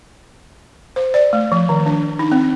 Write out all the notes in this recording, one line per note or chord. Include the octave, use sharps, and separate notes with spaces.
C5
D5
A3
F3
D#3
D4
D#4
C4